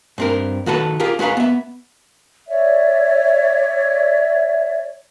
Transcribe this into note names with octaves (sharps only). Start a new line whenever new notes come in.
G2 C4 A#4
D#3 F#4 A4 B4
F4 G4 G#4 A#4
G#3 F#4 B4 F5 A#5
B3 E5
C#5 D5 E5